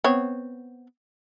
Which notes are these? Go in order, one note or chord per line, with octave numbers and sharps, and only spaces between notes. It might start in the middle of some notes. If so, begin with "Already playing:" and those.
B3 C4 C#5